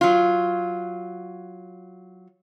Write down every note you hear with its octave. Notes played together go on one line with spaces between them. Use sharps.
F#3 F4